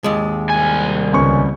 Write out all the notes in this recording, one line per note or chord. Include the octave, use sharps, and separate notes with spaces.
D#2 G#3
C2 G#5
C#2 C#4 C#6